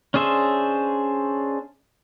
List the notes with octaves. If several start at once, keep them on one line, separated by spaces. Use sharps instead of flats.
C#4 D4 G#4 C5 E5